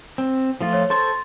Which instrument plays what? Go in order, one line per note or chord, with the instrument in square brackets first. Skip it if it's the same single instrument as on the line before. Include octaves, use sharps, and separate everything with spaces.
[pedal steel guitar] C4
F3 A3 F4
[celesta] C#5
[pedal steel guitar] A4 C5 C#6 [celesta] C6 A6